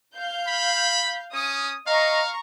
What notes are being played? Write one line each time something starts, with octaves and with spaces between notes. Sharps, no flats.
F5 G6
B5
C#4 D#6
D#5 F5 A#5 C#6